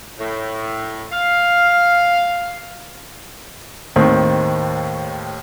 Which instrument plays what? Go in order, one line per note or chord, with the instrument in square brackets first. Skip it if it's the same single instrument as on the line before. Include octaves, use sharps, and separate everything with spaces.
[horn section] A2
F5
[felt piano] D#2 A2 D#3 C4